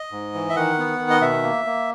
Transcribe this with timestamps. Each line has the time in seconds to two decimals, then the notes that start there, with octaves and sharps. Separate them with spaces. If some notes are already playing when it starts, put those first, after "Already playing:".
Already playing: D#5
0.12 G#2
0.34 E3
0.49 E5
0.56 D#3 F#5
0.78 B3
0.99 D#3
1.10 D#5
1.21 B2 E5
1.43 A#3
1.65 A#3